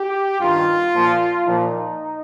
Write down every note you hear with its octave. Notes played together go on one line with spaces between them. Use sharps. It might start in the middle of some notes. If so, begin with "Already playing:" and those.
Already playing: G4
G2 D#3 F4
A#2 F3
A#2 F3 D#4